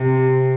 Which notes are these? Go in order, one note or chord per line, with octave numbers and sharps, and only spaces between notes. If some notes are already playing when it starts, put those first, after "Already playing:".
Already playing: C3